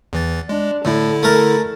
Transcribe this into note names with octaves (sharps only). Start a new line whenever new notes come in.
E2 E3 A6
G#3 D4
A2 D3 E4 A4
A3 A#4